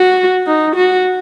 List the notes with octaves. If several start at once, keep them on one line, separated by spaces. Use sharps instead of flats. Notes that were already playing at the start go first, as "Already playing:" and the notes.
Already playing: F#4
D#4
F#4